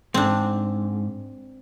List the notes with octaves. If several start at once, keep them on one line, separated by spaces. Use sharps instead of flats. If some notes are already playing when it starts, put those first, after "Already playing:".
G#2 C4 D4